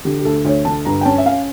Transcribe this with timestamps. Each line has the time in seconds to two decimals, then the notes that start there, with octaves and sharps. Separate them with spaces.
0.05 D3 G4
0.19 G4
0.25 D2 A4
0.45 D2 C#5
0.65 D3 A5
0.85 G2 A#5
1.01 G5
1.05 C#4 A5
1.18 E5
1.26 C#4 F5